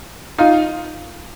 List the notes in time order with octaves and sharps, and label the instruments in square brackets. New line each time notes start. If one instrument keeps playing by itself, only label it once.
[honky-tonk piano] D#4 F4